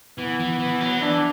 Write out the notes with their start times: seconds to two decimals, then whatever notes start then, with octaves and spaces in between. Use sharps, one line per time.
0.18 E3 B3
0.40 E3
0.60 E3
0.80 F#3
1.01 E3 D4